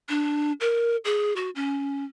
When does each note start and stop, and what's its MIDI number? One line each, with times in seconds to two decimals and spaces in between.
0.09 0.52 62
0.61 0.96 70
1.05 1.34 68
1.36 1.50 66
1.56 2.04 61